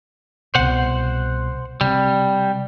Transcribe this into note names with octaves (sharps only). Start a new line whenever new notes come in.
C2 B2 C5 F#5
C3 G3